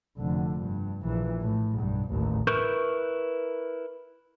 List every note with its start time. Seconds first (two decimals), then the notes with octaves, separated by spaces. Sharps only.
0.18 F1 D3
0.60 G2
1.03 A#1 E3
1.42 A2
1.76 B1 G2
2.10 A1 D#2
2.47 E4 A#4 B4 C#6 G6